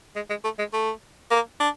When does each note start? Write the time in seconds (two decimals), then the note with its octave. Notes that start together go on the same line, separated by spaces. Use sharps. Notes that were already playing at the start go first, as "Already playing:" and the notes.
0.16 G#3
0.30 G#3
0.44 A3
0.59 G#3
0.73 A3
1.31 A#3
1.60 D4